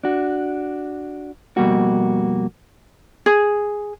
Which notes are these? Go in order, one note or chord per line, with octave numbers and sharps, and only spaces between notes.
D4 F#4
F2 B2 G3 A#3 F#4
G#4